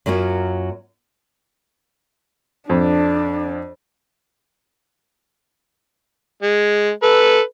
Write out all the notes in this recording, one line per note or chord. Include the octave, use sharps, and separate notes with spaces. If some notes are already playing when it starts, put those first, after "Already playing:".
F#2 F#3 A#3 F4 F#4
F2 D4
G#3
A4 B4